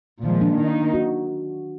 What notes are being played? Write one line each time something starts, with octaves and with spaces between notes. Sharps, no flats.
A#2 D#3 F3 G#3
D4
D#3 A#3 D#4
F#4